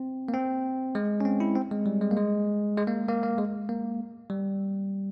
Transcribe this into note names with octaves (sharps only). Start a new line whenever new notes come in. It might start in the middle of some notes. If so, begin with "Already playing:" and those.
Already playing: C4
A#3
C4
G#3
C#4
C4
E4
C4
G#3
G3
G#3
A#3
G#3
G#3
A#3
A#3
A#3
G#3
A#3
G3